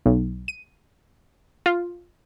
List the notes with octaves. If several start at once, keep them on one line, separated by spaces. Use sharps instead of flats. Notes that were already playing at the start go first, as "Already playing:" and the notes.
B1
D#7
F4